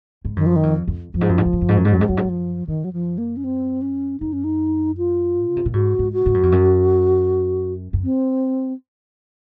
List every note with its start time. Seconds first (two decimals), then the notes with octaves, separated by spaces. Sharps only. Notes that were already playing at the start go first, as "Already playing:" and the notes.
0.25 G#2
0.36 F#2 D#3
0.46 F3
0.56 D#3
0.63 F2
0.88 F2
1.14 F#2 F3
1.21 G#2
1.29 F#2
1.38 G#2
1.46 F#2
1.53 G#2
1.61 F#2
1.69 G#2
1.77 F#2
1.85 G#2
1.91 F#2 F#3
1.99 G#2 G#3
2.09 F#2 F#3
2.17 G#2
2.24 F#2 F3
2.67 F#2 D#3
2.84 F#3
2.93 F3
3.18 A#3
3.37 C#4
3.44 C4
3.82 C#4
4.20 F#2 D#4
4.33 C#4
4.44 D#4
4.98 F4
5.47 C#3
5.57 C3
5.65 A#2
5.73 G#2 F#4
5.99 G#2
6.13 F#4
6.26 G#2
6.34 F#2
6.43 F2
6.52 F#2
7.93 F#2
8.04 C4